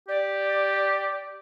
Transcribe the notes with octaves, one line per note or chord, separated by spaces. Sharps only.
G4 D5